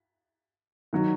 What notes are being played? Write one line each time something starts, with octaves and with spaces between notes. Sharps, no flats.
D#3 F#3